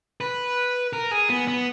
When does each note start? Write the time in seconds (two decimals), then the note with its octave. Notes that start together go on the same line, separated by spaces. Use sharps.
0.21 B4
0.93 A#4
1.11 G#4
1.30 B3
1.48 B3